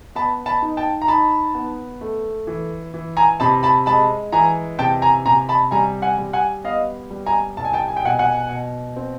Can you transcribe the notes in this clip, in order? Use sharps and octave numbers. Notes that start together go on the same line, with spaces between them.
B3 A5 B5
A5 B5
D#4
G5 A5
A#5
D#4 A5 B5
B3
A3
E3
E3
G#5 A#5
C3 A5 B5
A5 B5
G#3 A5 B5
E3 G#5 A#5
C3 G5 A5
G#5 A#5
C3 G#5 A#5
A5 B5
G3 G#5 A#5
F#5 G#5
G3
F#5 G#5
B3 D#5 F5
G3
G#5 A#5
C2 A5
G#5
G5 A5
G#5
G5
B2 F#5 G#5
F#5 G#5
B2
C4